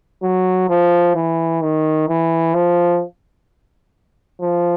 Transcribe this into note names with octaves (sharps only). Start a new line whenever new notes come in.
F#3
F3
E3
D#3
E3
F3
F3